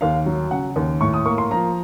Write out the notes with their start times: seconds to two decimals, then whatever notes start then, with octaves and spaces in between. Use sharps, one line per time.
0.01 D#2 F5
0.26 F#3
0.51 C#3 F#5
0.76 D#2
1.01 A2 C#6
1.14 D#6
1.25 A#3 C#6
1.38 C6
1.51 F3 A#5